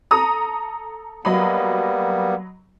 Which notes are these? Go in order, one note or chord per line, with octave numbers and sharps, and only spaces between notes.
A4 A#5 D#6
F#3 G3 A#3 B3 D#5 B5